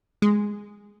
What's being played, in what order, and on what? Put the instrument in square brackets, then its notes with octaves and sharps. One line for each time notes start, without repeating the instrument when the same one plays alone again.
[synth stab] G#3